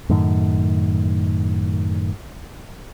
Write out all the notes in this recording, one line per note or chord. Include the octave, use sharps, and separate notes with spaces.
F#2 A2 D#3